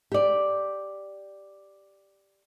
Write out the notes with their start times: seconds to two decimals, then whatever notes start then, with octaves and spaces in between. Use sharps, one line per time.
0.12 G4 D5